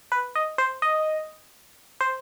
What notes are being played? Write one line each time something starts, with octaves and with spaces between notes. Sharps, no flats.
B4
D#5
C5
D#5
C5